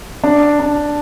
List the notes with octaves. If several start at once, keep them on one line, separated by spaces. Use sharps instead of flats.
D4
D4